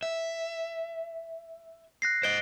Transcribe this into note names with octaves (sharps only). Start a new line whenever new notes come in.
E5
F#6 A#6 C7
C5 D#5 D7 G7